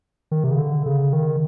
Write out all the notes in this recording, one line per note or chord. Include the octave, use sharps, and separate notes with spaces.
D#3
C3
C#3
D3
C#3
D#3